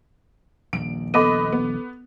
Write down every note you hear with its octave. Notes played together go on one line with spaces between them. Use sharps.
D#1 A#1 D7
B3 A4 D#5 B5 D6 D#7
B3